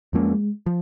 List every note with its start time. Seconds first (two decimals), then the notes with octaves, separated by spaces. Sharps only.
0.13 F2 F3 G#3 A#3 C#4
0.66 F3